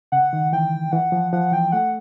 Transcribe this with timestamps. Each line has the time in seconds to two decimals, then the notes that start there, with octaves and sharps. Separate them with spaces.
0.12 C#3 F#5
0.33 D#3
0.53 E3 G5
0.92 E3 F#5
1.12 F3
1.33 F3 F#5
1.52 E3 G5
1.72 A3 F#5